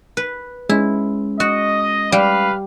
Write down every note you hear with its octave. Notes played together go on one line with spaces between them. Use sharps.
B4
G#3 C#4 E4
F#4 D#5
G3 B4 F5